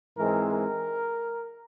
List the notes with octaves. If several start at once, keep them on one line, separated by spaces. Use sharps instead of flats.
G#2 E3 G#3 C4 A#4
A#4